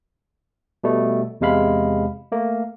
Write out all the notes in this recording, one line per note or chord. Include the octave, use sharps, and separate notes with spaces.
B2 G3 A3
E2 C3 G#3 F5 B5
A3 A#3